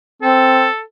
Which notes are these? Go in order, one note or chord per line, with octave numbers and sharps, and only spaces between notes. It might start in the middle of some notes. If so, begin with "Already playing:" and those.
C4 A4